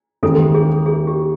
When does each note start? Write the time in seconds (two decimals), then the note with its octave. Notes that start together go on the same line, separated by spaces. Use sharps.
0.23 D#2 C#3 E3 G#3 A4
0.54 G#4
0.86 G#4
1.07 G4